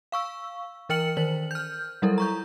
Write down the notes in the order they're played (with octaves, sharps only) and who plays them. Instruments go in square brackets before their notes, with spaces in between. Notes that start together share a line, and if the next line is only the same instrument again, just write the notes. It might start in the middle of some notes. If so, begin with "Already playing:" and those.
[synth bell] F5 C#6 E6
E3 A#4 G5 F6 C#7 F#7
D#3 A#4 C5 F#7
F6 G6
F#3 G3 E4 A4 A#4
A#5 C#6 G6